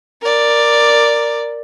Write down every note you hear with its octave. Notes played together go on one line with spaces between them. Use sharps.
A#4 D5